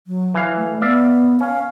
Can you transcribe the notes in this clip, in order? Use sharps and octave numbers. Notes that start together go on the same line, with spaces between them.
F#3
E3 F5
A3
B3 D5 E5 F5
C#4 F5